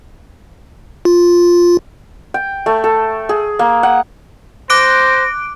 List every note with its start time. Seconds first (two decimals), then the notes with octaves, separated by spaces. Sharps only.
1.05 F4
2.34 G5
2.66 A3
2.84 A4
3.29 G#4
3.59 A#3
3.83 F#5
4.70 C5 D6 F#6 A#6 D7